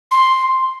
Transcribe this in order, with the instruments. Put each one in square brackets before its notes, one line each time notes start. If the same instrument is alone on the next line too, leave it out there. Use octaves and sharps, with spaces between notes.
[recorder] C6